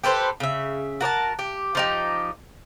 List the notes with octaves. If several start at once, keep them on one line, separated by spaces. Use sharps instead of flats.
G4 A4 B4 C5
C#3 E5
F#4 A#4 D5 A5
G4
F3 D#4 G4